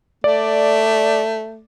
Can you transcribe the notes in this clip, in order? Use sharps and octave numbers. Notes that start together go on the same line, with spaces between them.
A3 D5